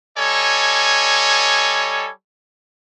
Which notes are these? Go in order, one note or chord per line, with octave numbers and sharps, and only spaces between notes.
G3 A4 C#5 D#5 G#5